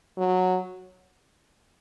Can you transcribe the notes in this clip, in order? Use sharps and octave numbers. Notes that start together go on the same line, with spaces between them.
F#3